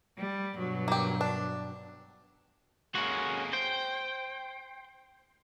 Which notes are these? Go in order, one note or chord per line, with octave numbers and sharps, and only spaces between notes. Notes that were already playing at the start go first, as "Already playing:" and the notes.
G3
G2 B2 F#3
A#3 G4
D4
G#3 A#3 C#4 F#4
C5 G5